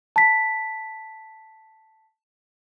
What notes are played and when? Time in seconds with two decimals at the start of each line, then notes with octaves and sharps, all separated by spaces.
0.16 A5 B6